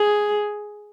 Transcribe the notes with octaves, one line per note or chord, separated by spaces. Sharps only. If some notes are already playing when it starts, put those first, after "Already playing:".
Already playing: G#4